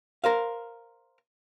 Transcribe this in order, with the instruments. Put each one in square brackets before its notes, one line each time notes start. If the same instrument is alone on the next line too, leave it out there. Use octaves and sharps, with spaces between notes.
[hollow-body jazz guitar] A#4 C5 F5